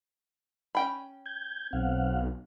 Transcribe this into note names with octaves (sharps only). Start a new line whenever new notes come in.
C#4 G5 B5
G6 G#6
B1 C4 F5 F#5